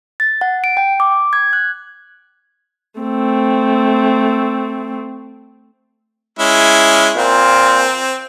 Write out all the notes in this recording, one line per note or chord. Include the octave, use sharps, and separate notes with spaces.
A6
F#5
D7
G5
D6
G#6
F#6
A3 C4
G#3 C#4 E4
A#2 C4